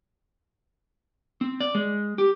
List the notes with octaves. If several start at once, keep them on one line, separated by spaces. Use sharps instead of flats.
C4
D5
G#3
G4